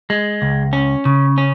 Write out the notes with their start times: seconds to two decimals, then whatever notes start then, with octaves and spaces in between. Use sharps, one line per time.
0.10 G#3
0.42 C#2
0.73 C#4
1.05 C#3
1.38 C#4